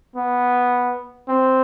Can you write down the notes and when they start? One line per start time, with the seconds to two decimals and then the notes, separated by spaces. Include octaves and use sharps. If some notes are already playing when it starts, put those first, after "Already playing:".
0.16 B3
1.28 C4